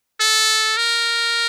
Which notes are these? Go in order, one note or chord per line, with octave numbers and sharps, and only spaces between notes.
A4
A#4